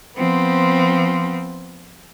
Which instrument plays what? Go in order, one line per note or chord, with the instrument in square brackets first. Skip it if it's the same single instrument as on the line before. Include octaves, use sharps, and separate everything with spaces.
[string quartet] F3 B3 C4